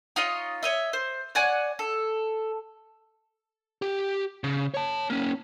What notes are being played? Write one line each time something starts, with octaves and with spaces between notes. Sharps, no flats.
D#4 F4 C#5 D#5
C#5 D#5 E5
C5
C#5 D5 F#5 G#5
A4
G4
C#3
C#5 A5
A#3 C#4